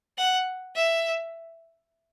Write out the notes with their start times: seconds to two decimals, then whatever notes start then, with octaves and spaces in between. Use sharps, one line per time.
0.18 F#5
0.75 E5